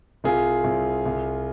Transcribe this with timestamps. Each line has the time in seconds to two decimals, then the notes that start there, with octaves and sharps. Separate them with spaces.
0.24 C2 F4 G#4
0.64 C2
1.06 C2